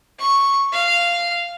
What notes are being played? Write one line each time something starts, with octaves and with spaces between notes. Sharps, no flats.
C#6
F5